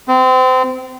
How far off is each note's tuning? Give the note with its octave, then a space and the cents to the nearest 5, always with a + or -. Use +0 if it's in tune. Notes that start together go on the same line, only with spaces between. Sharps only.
C4 -30